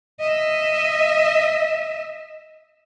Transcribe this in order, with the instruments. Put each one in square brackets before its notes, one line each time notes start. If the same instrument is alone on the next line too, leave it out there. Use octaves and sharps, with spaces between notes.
[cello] D#5 E5